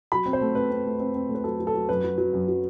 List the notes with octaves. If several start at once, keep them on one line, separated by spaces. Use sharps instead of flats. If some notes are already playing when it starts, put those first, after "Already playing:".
F#3 B5
C4
C5
A3
C4 B4
C4
A3
C4
C4
A3
B4
F#3 A4
F#3
A4
F#3
F#2 B4
F#3
F#3
F#2
F#3